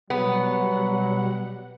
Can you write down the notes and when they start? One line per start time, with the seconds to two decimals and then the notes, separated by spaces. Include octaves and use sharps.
0.10 B2 F#3 G3 B3 F#5